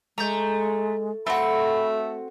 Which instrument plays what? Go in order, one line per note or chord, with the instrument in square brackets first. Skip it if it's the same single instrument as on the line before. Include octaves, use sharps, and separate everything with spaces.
[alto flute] G#3 [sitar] A3 [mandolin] A#5 G6
[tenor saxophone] A3 [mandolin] C4 F#4 [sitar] A4 [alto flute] B5